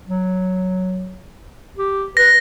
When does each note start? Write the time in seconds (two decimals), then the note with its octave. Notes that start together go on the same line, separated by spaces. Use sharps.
0.06 F#3
1.77 G4
2.17 B4 A#6